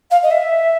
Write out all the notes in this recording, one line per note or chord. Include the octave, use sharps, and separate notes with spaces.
F5
D#5
E5